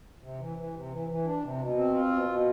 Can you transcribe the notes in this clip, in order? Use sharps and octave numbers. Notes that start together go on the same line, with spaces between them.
C3
E3
E3
C3
E3
E3
D4
C3
B2
C4
F4
B2
B2